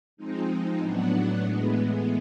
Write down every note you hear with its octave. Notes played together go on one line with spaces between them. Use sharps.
F3 G#3 C4 D#4
A2 F#3 B3 D4 F#4
A2 E3 G#3 B3